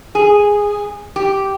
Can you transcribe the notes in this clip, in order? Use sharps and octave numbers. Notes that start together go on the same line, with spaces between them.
G#4
G4